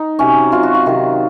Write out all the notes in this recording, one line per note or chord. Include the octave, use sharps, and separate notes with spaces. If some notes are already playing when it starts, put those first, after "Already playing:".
Already playing: D#4
C3 F#3 C#4
C3 F#3 F4
F#4
F4
C3 D#3 F#3